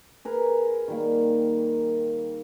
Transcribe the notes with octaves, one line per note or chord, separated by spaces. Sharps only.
G#4 A#4 B4
D#3 G3 A#3